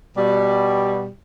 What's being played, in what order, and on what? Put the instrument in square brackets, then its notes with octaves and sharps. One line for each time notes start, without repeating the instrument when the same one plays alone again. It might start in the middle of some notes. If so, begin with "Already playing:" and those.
[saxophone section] B2 G3